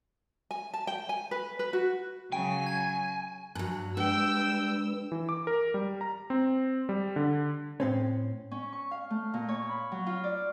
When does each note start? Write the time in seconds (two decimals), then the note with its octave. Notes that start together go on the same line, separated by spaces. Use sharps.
0.51 G#5
0.74 A5
0.87 G5
1.09 G#5
1.31 B4
1.59 B4
1.73 F#4
2.32 C#3 F#3 G5 G#5
2.66 G#6
3.55 G2 F#3 G#5 F#6
3.97 G3 G#3 D4 B4 G5 E6
5.12 E3
5.29 D6
5.47 A#4
5.74 G3
6.01 A#5
6.30 C4
6.89 G3
7.16 D3
7.80 A2 C4 C#4
8.51 C#4
8.73 C#6
8.91 F5
9.10 A3
9.34 A#2
9.49 C#5
9.69 B5
9.92 F#3
10.06 F4
10.24 D5